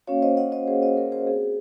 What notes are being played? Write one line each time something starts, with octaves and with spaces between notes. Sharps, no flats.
A#3 C#4 F#4 C#5 F5
C5 D#5
D#5 F#5
C5 D#5
G#4 C5
C5 D#5
A#4 C#5
G#4 C5
C4 F#4 G#4